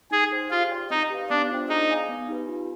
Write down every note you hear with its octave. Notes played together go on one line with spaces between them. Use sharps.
D#4 G#4
G#4 C5 G5
F4 G4
D5 G5
C4 D#4
G4 B4 F5
B3 D4
D4 F4 C5 G5
D#4 G#4
D5 F5 G#5
B3
D#4 G4 B4
F4